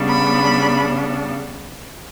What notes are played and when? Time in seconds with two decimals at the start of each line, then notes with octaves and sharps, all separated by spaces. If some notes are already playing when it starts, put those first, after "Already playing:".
Already playing: C#3 G3 B3 D4
0.10 B5